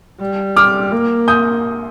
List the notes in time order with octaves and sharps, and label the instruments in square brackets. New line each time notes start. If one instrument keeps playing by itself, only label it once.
[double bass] G3
[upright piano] D6 F6
[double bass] A#3
[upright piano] D#6 G6